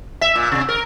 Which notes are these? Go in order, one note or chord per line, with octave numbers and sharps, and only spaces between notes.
E5
A#2
C3
A#4